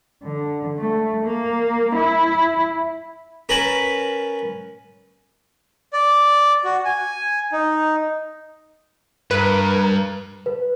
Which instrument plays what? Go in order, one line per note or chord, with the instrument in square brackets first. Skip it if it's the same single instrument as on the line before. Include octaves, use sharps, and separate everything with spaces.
[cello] D3
A3
A#3
E4
[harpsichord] C#4 A#4 B4 A5 B5 C#6
[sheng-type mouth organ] D5
F#4
G#5
D#4
[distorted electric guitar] G2 [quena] A#4 [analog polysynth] B4
[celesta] B4